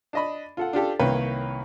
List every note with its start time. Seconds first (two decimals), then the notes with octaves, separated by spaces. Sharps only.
0.13 D4 D#5 B5
0.57 F4 A4 F#5
0.73 D4 F4 G4 A4
0.99 C2 D#3 A#3 B4 C#5 G5